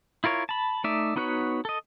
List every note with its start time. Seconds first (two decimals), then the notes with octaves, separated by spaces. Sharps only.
0.24 E4 F4 A#4 C#5
0.49 A5 B5
0.84 A3 D#4 D5 E5
1.16 B3 D#4 F#4 B4 C#5
1.65 A4 D#5